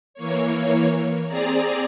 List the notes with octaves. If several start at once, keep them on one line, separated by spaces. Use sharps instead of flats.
E3 A#3 C#5
C4 G#4 D5 A#5